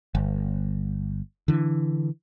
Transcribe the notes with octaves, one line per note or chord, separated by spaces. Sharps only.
G1
D3 E3